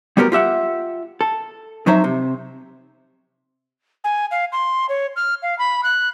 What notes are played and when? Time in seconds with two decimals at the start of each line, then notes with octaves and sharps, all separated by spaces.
0.17 G3 B3 F#4 G4 A#4
0.32 F4 G4 E5 F#5
1.21 A4
1.87 F2 F#3 D#4 C5 E5
2.04 C3
4.04 G#5
4.31 F5
4.52 C6
4.89 C#5
5.16 F6
5.42 F5
5.59 B5
5.83 F#6